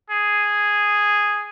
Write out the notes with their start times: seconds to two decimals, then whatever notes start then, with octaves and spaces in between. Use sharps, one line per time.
0.10 G#4